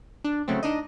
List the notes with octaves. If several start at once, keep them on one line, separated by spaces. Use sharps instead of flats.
D4
C#3 F#3 A3 C4
D4 D#4 D#5